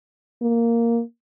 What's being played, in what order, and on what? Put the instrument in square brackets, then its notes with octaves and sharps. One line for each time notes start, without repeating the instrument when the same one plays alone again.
[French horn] A#3